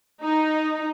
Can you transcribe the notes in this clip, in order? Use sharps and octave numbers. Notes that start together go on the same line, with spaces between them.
D#4